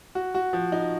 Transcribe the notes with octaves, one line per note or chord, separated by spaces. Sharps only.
F#4
F#4
F3
D#4